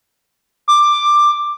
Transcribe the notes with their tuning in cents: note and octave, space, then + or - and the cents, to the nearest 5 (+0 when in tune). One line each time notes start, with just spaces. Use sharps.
D6 +10